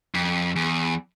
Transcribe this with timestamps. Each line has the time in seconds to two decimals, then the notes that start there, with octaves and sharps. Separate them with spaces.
0.15 F2
0.56 E2